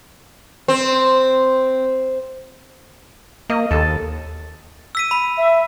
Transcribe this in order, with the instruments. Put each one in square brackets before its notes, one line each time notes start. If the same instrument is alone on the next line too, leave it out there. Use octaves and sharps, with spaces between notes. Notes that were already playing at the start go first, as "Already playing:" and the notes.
[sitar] C4
[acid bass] A#3 [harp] D#5
[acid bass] D#2 [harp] A4 E6 A6
[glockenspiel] E6 B6 D#7
B5
[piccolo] E5